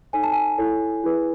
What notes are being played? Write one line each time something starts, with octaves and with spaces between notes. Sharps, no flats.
D#4 A4 C#5 G#5
A5
G#5
E4 A4 C#5
E4 G#4 B4